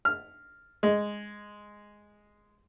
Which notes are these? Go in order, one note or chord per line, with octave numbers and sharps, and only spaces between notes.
F6
G#3